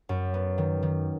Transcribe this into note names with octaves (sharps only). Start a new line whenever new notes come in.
F#2
B3
D#3
D#3